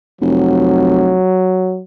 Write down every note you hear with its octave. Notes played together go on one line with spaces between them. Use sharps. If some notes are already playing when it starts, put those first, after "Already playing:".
F1 F#3